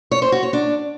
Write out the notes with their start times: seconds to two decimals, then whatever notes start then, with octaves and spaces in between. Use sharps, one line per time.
0.11 C#5
0.22 C5
0.32 F#4
0.43 C#5
0.53 D4